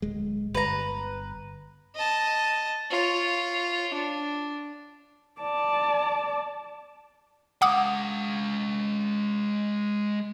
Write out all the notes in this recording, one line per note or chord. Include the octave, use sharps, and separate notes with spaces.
D1 G#3
G1 B4 A#5
D#5 A5
F4 C#5
D4
D5 A5
G#3 F5 F#5 D6 D#6